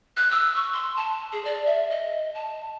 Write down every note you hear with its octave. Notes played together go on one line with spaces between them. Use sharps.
F#6
E6
C#6
C6
A5
G#4
D5
E5
D#5
A5